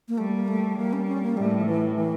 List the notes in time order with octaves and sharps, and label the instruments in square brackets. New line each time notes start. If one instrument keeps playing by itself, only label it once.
[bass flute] A#3
[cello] G3 [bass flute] A3
[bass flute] A#3
A3
[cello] G3 [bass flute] A#3
[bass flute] C#4
C#4
A#3
[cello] A2 [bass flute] G3
[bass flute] F3
E3
E3